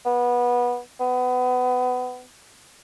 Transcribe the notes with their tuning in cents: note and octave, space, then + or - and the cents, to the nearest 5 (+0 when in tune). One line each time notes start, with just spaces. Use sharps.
B3 -20
B3 +25